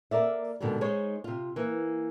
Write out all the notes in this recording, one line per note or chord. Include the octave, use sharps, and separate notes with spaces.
A#3 A#4 D5 E5
G#2 B2 D3 D#3 G3
G#3 D#4 C5 C#5
C3 F4
E3 A#3